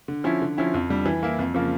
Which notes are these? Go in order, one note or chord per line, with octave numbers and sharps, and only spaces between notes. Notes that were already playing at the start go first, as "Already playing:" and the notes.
D3
F3 C#4 E4
D3
F3 C#4 E4
F2
D3 G3
E3
A#3 E4
F2
C#3 F3 A#3